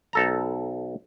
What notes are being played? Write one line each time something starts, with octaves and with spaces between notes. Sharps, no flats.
B1 A4 A#5